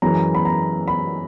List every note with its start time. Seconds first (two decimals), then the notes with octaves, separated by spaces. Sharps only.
0.02 F#2 E3 G#3 A#5
0.35 B5
0.45 A#5
0.88 B5